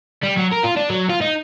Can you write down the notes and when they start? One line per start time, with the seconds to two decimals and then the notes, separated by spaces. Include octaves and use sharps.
0.23 G3
0.38 F#3
0.53 A#4
0.64 F4
0.77 D4
0.90 F#3
1.10 F4
1.21 D#4